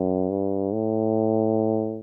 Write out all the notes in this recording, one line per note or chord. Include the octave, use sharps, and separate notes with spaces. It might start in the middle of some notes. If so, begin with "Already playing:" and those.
Already playing: F#2
G2
A2